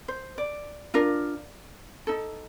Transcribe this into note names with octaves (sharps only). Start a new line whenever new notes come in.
C5
D5
D4 F4 A#4
D#4 A4